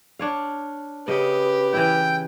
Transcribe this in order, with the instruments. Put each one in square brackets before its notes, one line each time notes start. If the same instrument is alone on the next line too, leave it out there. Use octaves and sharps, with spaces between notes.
[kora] D4 C#5 F5
[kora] C#3 D#5 [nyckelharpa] G4 [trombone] B4
[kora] E3 E4 [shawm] G5